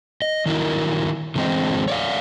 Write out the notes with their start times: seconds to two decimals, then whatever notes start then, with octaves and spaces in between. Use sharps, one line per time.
0.22 D#5
0.46 D#3 F#3 E4 A#4
1.36 D3 E3 G#3 C4 C5 D#5
1.88 C#5 D5 F5